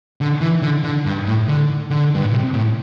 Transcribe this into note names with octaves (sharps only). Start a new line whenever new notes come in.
D3
E3
D3
D3
G2
A2
D3
D3
G2
A2
C3
A2